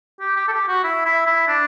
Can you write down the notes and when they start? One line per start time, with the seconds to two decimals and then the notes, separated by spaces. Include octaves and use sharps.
0.20 G4
0.36 G4
0.48 A4
0.52 G4
0.68 F#4
0.84 E4
1.05 E4
1.26 E4
1.48 D4